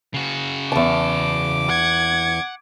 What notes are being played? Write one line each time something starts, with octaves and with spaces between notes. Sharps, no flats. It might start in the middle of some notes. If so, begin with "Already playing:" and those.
C#3 F#4
E2 A5 D6
F#5 G#6